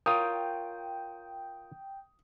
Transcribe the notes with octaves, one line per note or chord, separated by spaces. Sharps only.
F4 A#4 C#5 G5 D#6